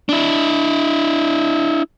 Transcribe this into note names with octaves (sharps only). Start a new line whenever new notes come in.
D4 E4